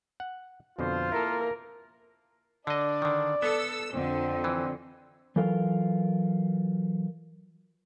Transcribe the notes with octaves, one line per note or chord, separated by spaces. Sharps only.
F#5
F2 B2 D3 F4 C5
A#3 E4 A4 A#4
D3 D4 D5 D#5
D3 D#3
B3 A4 E6
F2 D3 C4
E3
E3 F#3 F4 A4 A#4